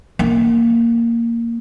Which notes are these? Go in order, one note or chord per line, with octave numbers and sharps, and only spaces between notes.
A#3